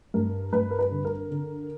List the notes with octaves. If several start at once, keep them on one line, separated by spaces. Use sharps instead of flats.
G2 A#4
G2 B4
A#4
B4
D3
A#4
D3